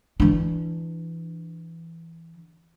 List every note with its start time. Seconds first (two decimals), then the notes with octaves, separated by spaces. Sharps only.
0.20 E3 D4